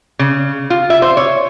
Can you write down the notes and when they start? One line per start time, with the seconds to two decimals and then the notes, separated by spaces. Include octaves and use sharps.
0.19 C#3
0.70 F4
0.90 E5
1.02 C5
1.17 C#5